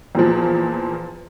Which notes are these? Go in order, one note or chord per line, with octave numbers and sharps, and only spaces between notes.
E2 A#2 F3